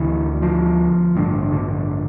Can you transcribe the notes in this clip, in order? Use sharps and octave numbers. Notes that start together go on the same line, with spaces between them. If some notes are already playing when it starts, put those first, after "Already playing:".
Already playing: D2 D3 E3
F3
A1 G2 D3
D3